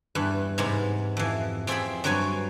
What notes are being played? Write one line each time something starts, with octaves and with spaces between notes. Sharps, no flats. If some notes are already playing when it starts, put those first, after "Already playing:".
E2 G2 B4
G#2 C3 G#3 B3
F2 E3
F2 C4 G#4 E5 G5 B5
G2 F#3 C4 B4 C#5 G#5